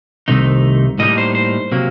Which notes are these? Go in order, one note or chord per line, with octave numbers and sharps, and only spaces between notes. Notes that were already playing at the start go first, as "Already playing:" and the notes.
C2 C3 D#3 A3 D#4
A2 G3 A#3 D#4 D#5
C5
C5
C3 F#3 A#3